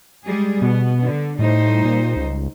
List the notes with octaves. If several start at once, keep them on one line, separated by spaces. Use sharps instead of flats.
G3 G#3 G#4
B2 B3
D3
A2 G3 D#4 C5
A#2
C#2